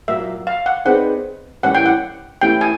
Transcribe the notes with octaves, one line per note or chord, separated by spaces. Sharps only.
A#2 F#3 A#3 E5
F5
F#5
C4 D#4 G#4 B4 D5 F#5
A2 E3 G3 A#3 C#4 F#5
G5
F#5
E3 A3 C#4 E4 G4 G5
G#5